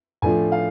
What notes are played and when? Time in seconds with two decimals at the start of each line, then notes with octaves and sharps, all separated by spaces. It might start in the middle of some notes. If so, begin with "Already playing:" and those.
0.22 A2 F3 A3 D4 F4 G#5
0.52 F5